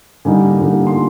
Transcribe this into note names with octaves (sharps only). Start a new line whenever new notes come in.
D3 G3 A#3 D#4 G#5
D3 G3 A#3 D#4
C6